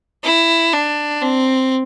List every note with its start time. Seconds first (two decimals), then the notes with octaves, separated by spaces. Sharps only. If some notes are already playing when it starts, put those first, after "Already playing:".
0.24 E4
0.73 D4
1.22 C4